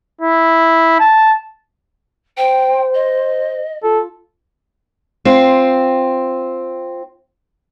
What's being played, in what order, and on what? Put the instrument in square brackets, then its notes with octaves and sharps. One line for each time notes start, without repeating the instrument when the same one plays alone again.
[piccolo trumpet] E4
A5
[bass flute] C5 [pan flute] G5
[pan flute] D#5
[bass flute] F4 [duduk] A4
[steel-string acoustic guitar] C4 F4